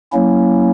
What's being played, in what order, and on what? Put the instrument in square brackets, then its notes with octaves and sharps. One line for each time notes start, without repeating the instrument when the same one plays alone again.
[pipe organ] F#3 A#3 C#4 E4